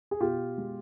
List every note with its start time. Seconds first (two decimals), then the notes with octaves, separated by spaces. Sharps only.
0.11 G#4
0.20 B2 F4 G4
0.58 G#3